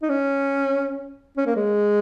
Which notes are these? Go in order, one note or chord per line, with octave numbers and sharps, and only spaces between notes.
D#4
C#4
C#4
A#3
G#3